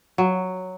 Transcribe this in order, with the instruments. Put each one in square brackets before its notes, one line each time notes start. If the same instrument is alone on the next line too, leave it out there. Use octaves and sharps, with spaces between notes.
[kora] F#3